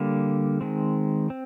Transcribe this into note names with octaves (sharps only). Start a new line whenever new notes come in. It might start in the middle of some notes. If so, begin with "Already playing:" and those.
Already playing: D3 G3 A#3
D#3 G#3 C4
C4